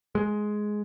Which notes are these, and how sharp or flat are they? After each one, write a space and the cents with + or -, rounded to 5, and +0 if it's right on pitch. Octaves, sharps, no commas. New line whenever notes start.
G#3 +10